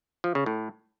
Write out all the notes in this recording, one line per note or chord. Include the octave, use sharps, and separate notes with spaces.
F3
C#3
A2